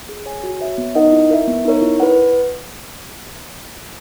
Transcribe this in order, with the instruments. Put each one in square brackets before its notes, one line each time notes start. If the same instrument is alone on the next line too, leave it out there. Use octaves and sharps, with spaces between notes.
[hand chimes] G#4
C#5 G#5
F#4
C#5 E5
B3
D#4 A#4 D#5 F#5
E4
A#4 E5
B3
D#4 A#4 C#5
E4
B4 F#5